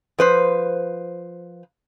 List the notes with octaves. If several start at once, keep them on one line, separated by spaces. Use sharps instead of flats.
F3 B4 C5